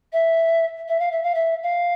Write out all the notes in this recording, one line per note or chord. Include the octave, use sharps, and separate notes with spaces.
E5
E5
F5
E5
F5
E5
F5